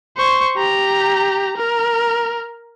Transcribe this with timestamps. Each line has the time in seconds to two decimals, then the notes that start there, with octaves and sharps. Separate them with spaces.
0.17 C5 C#6
0.57 G4 A#5
1.57 A#4